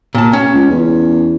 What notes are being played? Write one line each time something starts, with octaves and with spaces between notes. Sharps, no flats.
A#2 A5
C#4
C#2
E2